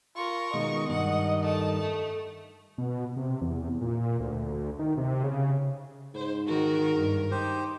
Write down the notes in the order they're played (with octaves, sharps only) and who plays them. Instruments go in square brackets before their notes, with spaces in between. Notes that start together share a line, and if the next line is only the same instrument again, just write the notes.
[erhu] F4 [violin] A#4 C#6
[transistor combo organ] B2 D#3 G#3 [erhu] D#5
[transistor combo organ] G2 D#3 [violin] F#5
[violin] A3 A5
A3
[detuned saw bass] B2
C3
E2
A#2
D2
D#3
C3
C#3
[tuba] G#2 [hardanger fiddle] C5
[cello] D#3 F#4 [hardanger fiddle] A#4
[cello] G2
[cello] D#4 [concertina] G4 C5